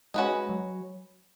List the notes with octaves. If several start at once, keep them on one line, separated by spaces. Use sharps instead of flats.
G#3 C#4 F#4 B4 D#5
F#3